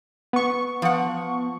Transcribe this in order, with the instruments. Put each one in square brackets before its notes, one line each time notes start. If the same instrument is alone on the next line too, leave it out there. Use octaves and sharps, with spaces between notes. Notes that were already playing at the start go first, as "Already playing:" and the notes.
[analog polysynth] B3 C#6
[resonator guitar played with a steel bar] F3 F#5